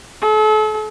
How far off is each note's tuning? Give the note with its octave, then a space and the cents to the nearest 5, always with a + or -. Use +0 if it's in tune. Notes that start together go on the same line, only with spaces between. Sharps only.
A4 -40